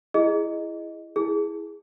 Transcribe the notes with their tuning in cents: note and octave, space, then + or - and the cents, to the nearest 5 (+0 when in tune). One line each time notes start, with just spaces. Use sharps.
E4 +15 G#4 +0 D#5 +0
E4 +0 G#4 +0